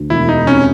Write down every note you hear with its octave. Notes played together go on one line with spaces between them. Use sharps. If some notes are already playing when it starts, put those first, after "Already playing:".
Already playing: D2
E1 E4
D#4
C3 C#4